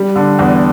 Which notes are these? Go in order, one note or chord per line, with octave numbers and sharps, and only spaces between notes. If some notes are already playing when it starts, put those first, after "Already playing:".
Already playing: G3
D3
E2